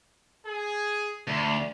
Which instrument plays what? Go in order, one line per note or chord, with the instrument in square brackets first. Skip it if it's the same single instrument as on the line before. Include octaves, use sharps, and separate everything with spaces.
[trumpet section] G#4
[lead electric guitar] D2 [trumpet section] D5